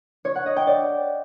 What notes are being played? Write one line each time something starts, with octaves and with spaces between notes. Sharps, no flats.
C#5
F#5
D#5
G5
D5